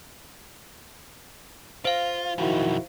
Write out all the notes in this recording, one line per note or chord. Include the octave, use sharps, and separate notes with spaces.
F4 C5 F5
B1 F2 D#3 E4 F#4